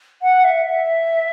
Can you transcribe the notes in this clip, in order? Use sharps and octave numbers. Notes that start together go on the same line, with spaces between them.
F#5
E5
E5